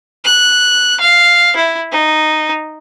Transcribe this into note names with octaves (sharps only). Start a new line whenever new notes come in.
F#6
F5
E4
D#4